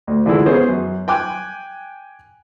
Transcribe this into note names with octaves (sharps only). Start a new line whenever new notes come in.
D2
D3 E3 F3 G#3 E4
B3 C#4 G#4 C5
F#2
G5 G#5 D6 F#6